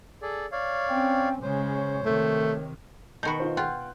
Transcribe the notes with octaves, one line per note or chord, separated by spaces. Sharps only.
G#4 A4 D5
C#5 D5 F5
C4 C#4 G5
C#3 G#3 C5 C#5
C3 D#3 A3
B2 D#3 F#4 B5 G6
D#4 F4 C5
F4 F#5 G5 F#6